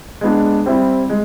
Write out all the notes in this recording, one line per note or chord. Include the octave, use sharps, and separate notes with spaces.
G#3 B3 D4
G3 C4 E4
G#3